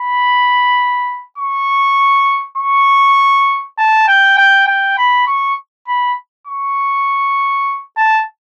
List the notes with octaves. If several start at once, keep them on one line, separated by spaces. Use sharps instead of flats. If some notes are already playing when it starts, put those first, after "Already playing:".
Already playing: B5
C#6
C#6
A5
G5
G5
G5
B5
C#6
B5
C#6
A5